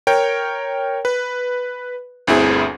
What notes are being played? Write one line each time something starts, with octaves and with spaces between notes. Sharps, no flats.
A#4 C#5 G5
B4
G1 D2 C4 E4 G#4